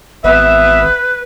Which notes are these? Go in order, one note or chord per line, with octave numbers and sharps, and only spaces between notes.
G#1 B3 B4 E5